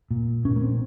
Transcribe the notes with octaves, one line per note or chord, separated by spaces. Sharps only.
A#2
A#2 C#4
A#3
C4